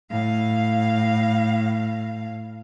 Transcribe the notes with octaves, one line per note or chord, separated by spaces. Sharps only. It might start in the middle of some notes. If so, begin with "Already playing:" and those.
A2 F5